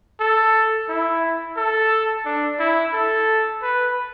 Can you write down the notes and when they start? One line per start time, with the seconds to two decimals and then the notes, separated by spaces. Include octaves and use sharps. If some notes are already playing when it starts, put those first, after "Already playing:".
0.20 A4
0.89 E4
1.57 A4
2.26 D4
2.60 E4
2.94 A4
3.62 B4